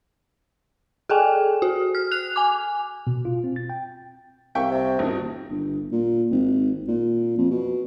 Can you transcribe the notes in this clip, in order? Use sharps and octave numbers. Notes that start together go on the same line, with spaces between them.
G#4 A4 G5 G#5
F#4
F6
F#6 F7
G#5 D6
B2
F4
C4
A6
G5
C2 A#3 E5 G5 C#6
C3
D#1 G#1 D#3
G1
A#2
G#1
A#2
F2
B2